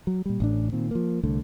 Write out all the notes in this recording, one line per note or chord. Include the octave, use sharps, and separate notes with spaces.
F#3
A#2 G3
A1 A2 D4
A#2 D#3 C4
F3 A#3
C2 D3 A3